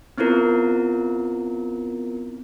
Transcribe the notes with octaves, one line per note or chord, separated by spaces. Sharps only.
B3 C4 E4 F4 A#4